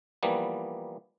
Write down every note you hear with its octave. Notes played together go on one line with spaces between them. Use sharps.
E3 F3 G3 A#3 B3